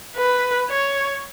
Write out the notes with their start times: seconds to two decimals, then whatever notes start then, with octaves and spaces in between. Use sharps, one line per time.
0.16 B4
0.70 C#5